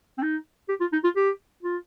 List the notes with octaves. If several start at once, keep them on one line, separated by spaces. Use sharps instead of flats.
C4
D#4
G4
F4
D#4
F4
G4
F4